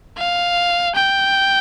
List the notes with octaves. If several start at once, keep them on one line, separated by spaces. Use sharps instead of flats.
F5
G5